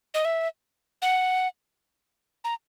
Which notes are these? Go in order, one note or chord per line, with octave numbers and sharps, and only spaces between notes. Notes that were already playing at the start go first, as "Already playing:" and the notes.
D#5
E5
F#5
A#5